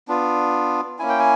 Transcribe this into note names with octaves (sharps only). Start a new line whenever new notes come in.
B3 D4 F4
A#3 C#4 E4 G#5
G5
G#5